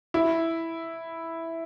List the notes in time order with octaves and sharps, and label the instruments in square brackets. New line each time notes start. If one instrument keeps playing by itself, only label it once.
[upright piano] E4